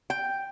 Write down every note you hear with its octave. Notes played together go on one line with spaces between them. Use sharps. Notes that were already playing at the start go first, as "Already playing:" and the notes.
G5